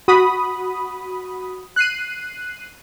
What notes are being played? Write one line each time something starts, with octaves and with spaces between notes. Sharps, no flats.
F#4 B5 D#6
F#6 C7 D#7